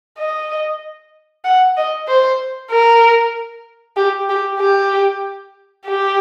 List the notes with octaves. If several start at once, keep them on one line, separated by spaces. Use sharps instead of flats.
D#5
F#5
D#5
C5
A#4
G4
G4
G4
G4